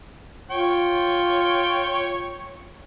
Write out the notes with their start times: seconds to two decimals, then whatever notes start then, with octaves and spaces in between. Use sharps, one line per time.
0.51 F4 C#5 G5